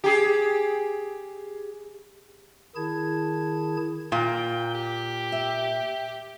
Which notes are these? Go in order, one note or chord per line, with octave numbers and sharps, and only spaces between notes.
G4 G#4
D#3 E4 G#4 A5 G#6
A#2 G5
G4
E5